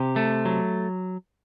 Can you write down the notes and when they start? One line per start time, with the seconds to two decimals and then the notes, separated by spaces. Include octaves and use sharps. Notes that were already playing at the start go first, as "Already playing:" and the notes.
Already playing: C3 G4
0.16 A3
0.45 F#3